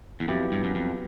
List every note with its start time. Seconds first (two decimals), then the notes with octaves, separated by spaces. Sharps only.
0.20 E2
0.28 F2 F#3 B3 E4 G4
0.52 G2
0.64 F#2
0.75 F2